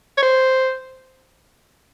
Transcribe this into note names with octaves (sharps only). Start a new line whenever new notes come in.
C#5
C5